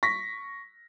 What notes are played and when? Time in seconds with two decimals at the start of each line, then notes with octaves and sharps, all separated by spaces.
0.03 C#6 A#6 B6